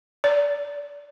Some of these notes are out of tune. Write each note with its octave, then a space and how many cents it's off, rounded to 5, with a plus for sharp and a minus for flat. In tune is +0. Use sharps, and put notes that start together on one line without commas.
D5 -20